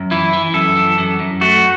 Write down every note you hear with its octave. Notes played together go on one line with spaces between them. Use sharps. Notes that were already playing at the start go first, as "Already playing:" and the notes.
Already playing: F#2
E3 E4
E3
F#2 A4
E3
F#2
F#2
A3 F#4